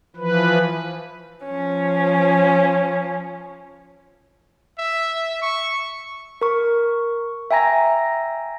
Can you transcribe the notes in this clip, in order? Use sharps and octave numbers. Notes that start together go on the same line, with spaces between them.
E3 F3 B4
F3 C#4
E5
C#6
A#4 C#6
E5 G5 G#5 A#5 A#6